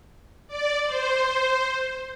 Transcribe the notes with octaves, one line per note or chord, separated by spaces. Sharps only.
D5
C5